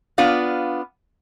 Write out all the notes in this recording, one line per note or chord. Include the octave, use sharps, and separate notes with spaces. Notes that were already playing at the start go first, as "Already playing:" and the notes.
B3 D4 F4 F5